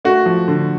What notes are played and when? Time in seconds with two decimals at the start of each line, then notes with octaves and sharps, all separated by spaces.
0.05 A3 F#4
0.26 F3
0.48 D3